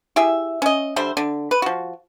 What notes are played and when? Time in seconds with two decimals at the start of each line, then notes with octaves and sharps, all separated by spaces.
0.16 E4 G4 G#4 E5
0.62 C#4 D#5
0.96 D3 G3 C5 E5
1.17 D3
1.51 B4
1.62 F3 F#4